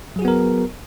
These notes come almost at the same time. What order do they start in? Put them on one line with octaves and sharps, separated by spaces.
F#3 G#4 F#4 B3 A#4